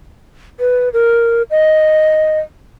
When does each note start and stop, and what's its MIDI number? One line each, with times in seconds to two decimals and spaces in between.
0.60 0.89 71
0.93 1.42 70
1.50 2.39 75